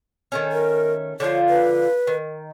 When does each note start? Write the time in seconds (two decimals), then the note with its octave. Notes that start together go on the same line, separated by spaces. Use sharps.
0.32 D#3 A3 C#4
0.52 A#4
1.20 D3 F3 F4 C#5
1.49 B4
2.07 D#3